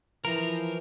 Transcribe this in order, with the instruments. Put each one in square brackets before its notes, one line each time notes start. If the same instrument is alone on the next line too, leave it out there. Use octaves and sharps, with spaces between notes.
[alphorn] E3 [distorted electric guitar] F3 [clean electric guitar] A#4 [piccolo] A#5